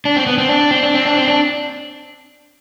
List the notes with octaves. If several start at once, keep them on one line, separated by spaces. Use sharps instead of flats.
D4
C4
B3
C4
D4
C4
D4
C4
D4
C4
D4